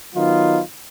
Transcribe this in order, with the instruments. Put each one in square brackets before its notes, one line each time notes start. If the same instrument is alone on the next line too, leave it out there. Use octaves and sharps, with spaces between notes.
[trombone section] D#3 F#3 B3 D#4 F4